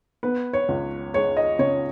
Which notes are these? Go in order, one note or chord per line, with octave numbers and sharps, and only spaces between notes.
B3 B4
C#5
C#2
G#3 C#5
D#5
C#3 C#5